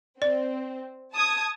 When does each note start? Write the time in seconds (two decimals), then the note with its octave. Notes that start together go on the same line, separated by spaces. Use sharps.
0.22 C4 D5
1.14 A5 D#6 G#6